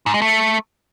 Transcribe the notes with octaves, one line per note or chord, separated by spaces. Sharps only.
G#2
G#3
A3